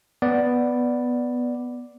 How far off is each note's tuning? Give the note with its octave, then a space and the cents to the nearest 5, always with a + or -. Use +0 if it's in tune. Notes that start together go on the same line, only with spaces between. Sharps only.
B3 +0 D5 +0